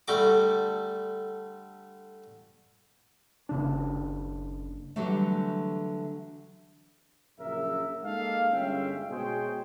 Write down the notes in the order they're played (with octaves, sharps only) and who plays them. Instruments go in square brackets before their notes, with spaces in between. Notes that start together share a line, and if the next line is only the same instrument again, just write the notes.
[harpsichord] D3 G3 A3 D6
[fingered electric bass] F#1 C#3 D4
[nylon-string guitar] D3 E3 F#3 G3 A3
[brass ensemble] A#1 F#2 C#3 A#4 E5
G#3 A#3 D#4 A4 F5
G1 G#3 C#4 E5 F5 G5
B2 G#3 G#4 C5 C#5 G5